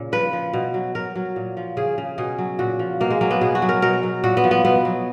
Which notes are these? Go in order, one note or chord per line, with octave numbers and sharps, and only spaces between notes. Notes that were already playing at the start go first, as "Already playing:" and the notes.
Already playing: A#2 C#3
F3 B4
F3
B2
F#3
F#3 A#4
F#3
A#2
F3
C#3 G#4
C#3
B2 G#4
F#3
A#2 F#4
F3
B2 A#3
G#3
F#3 A#3
B3
B2 G#4
F#4
F#3
A#4
B2 A#4
F#3
A#2 F#4
B3
F3
B3
B2 B3
F#3